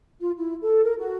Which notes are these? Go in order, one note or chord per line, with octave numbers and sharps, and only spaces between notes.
F4
E4
A4
A#4
F#4